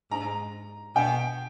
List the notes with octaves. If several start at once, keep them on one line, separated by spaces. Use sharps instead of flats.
G#2 A#5
B2 G5